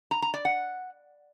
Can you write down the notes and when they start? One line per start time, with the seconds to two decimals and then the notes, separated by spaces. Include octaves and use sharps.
0.11 A#5
0.22 A#5
0.34 D5
0.45 F#5